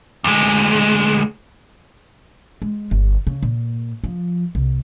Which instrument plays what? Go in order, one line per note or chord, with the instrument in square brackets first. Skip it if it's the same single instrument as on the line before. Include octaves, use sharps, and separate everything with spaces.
[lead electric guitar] D2 G#3
[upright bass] G#3
G1
C#3
A#2
F3
C2